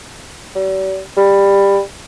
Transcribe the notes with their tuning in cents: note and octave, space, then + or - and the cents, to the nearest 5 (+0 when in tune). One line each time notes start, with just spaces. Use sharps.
G3 -45
G3 +15